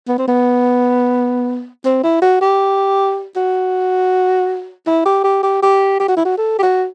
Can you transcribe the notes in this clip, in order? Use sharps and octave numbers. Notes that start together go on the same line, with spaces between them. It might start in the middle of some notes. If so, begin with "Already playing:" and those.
B3
C4
B3
C4
E4
F#4
G4
F#4
E4
G4
G4
G4
G4
G4
F#4
E4
F#4
A4
G4
F#4